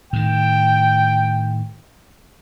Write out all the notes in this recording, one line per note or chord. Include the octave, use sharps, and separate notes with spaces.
A2 D#3 G5